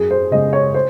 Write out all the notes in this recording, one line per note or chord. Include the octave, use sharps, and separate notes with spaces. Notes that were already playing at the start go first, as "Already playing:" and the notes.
Already playing: F#2 G#4
C5
C#3 G#3 D#5
C#5
C5